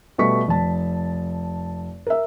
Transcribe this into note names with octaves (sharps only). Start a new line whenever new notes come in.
B2 G3 A3 C#6 B6
F1 A5
A#4 E5